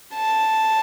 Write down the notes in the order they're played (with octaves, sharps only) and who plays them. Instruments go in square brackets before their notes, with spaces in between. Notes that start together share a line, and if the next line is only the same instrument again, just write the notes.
[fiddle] A5